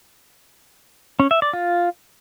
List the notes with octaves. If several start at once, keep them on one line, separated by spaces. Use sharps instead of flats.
C#4
E5
D5
F4